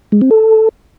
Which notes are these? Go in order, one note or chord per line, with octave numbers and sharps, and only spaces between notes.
G#3
C4
A4